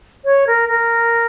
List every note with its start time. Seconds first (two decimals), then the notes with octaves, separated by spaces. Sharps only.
0.25 C#5
0.47 A#4
0.69 A#4